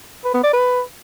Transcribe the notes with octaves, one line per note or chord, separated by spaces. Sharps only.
B4
B3
D5
B4